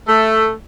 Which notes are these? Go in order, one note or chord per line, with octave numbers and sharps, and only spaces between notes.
A3